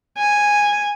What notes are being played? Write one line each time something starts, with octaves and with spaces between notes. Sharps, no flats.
G#5